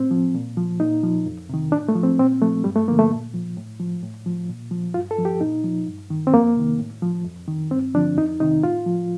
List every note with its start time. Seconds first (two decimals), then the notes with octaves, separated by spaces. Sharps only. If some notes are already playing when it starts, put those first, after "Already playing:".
Already playing: A2 C4
0.11 F3
0.35 A#2
0.57 F3
0.80 A#2 D#4
1.03 F3
1.26 F2
1.49 C3 D#3
1.72 A2 D4
1.89 A3
1.95 F3
2.03 C4
2.19 A#2 C4
2.42 F3 A3
2.64 G2 G3
2.76 A3
2.88 D3 F3 A#3
2.99 A3
3.11 A#2
3.34 F3
3.57 A2
3.79 F3
4.03 A2
4.26 F3
4.49 A#2
4.71 F3
4.94 G2 F4
5.11 A4
5.19 F3
5.25 G4
5.41 A#2 D#4
5.64 F3
5.87 G2
6.10 D#3
6.27 C4
6.33 F2 A#3
6.56 C3 D#3
6.79 A2
7.02 F3
7.25 F2
7.48 D#3
7.71 G2 C4
7.94 D3 F3 D4
8.17 F2 D#4
8.40 C3 D#3 D#4
8.63 A2 F4
8.86 F3